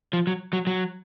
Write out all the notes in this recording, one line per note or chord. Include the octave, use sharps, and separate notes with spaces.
F3
F#3
F#3
F#3